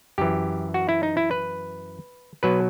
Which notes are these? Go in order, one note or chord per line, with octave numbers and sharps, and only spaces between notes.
F#2 E3 G4
F#4
E4
D#4
E4
B4
B2 F#3 B4